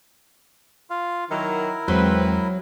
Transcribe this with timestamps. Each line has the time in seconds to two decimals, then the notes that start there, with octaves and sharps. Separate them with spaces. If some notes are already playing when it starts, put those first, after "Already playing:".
0.90 F4 F5
1.30 D#3 F#3 E4 A#4
1.88 E2 F#3 G#3 C4 B4